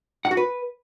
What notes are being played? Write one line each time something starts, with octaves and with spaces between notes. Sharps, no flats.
F#5
F#4
B4